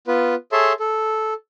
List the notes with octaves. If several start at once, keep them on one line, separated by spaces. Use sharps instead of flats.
B3 F4 B4
G#4 A4 C#5 E5 A5 C6
A4